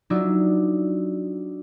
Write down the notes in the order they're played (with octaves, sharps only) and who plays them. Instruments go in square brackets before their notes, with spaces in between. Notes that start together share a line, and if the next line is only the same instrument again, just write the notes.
[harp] F#3 D4 D#4 F4 D5 E5